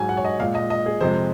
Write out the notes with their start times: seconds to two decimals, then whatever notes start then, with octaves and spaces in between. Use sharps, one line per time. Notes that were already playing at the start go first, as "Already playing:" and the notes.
Already playing: G#2 F#3 G#5
0.09 F#5
0.17 C#5
0.25 D#5
0.39 A#2 F5
0.43 G#3
0.55 D#5
0.70 D#5
0.86 G#4
1.00 F2 C3 F3 G#3 C5